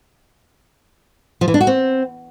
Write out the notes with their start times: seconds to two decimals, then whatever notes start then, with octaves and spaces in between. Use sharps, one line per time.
1.41 F3
1.48 E3
1.54 D4
1.61 F#4
1.67 C4